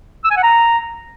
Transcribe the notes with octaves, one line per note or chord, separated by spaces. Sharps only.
E6
G#5
F#5
A#5